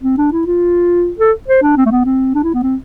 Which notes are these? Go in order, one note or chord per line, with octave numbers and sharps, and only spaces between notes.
C4
D4
E4
F4
A4
C5
D4
C4
A3
B3
C4
D4
E4
B3
C4